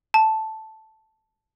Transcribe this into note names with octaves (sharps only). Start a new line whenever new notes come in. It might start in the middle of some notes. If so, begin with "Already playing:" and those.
A5